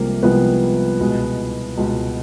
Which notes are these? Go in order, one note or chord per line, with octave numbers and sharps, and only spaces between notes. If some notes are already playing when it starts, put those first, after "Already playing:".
Already playing: C2 C3 F3 G#3 A#3
C2 C3 F3 G#3 B3
C#2 B2 G#3
C#2 B2 G#3